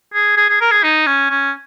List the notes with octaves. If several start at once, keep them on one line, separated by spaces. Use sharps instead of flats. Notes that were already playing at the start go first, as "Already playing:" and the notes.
G#4
G#4
G#4
A#4
G#4
D#4
C#4
C#4